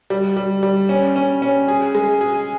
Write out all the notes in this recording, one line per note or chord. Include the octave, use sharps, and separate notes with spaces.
G3
G3
G3
C#4
C#4
C#4
G#4
G#3
G#4